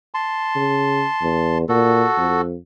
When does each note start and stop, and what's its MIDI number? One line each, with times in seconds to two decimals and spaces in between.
0.14 1.58 81
0.14 1.58 84
0.56 1.04 49
1.22 1.65 40
1.69 2.05 46
1.69 2.41 66
1.69 2.41 69
2.17 2.56 41